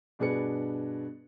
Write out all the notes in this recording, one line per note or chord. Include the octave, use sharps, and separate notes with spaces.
G2 B2 D4 G#4 B4 C#7